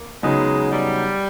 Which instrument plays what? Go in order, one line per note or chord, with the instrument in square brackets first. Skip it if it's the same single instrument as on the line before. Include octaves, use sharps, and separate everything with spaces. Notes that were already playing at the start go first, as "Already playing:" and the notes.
Already playing: [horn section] A#3
[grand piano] C#3 F#3 B3 D#4 G#4 [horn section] G#3
[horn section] G3